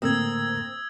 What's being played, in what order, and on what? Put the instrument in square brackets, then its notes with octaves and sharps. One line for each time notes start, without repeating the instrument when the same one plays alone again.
[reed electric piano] A2 D3 A3 [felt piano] A#3 [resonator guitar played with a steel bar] C4 [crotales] D#6 E6 G#6